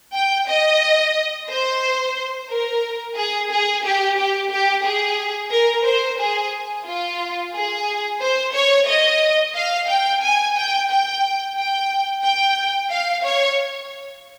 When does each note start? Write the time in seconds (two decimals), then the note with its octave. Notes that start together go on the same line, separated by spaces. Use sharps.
0.14 G5
0.48 D#5
1.49 C5
2.50 A#4
3.16 G#4
3.51 G#4
3.84 G4
4.18 G4
4.51 G4
4.84 G#4
5.51 A#4
5.85 C5
6.19 G#4
6.86 F4
7.54 G#4
8.21 C5
8.54 C#5
8.87 D#5
9.55 F5
9.88 G5
10.22 G#5
10.56 G5
10.89 G5
11.56 G5
12.23 G5
12.91 F5
13.24 C#5